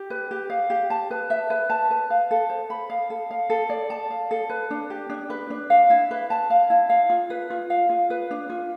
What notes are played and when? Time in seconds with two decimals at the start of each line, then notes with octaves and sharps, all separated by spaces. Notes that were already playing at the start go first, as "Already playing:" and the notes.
Already playing: G4
0.10 B4
0.31 G4
0.50 F5
0.70 G4
0.90 A5
1.11 B4
1.30 E5
1.50 B4
1.70 A5
1.91 B4
2.10 F5
2.31 A4
2.50 C5
2.70 B5
2.90 F5
3.10 A4
3.31 F5
3.50 A4
3.70 D5
3.90 A5
4.11 F5
4.31 A4
4.50 B4
4.71 D4
4.90 G4
5.10 D4
5.30 B4
5.50 D4
5.70 F5
5.90 E4
6.11 B4
6.30 A5
6.50 F5
6.70 E4
6.90 F5
7.10 F4
7.30 B4
7.50 F4
7.70 F5
7.90 F4
8.10 B4
8.31 D4
8.50 F4